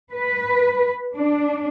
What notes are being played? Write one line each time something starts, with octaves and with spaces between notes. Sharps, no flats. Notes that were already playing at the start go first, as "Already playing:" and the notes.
B4
D4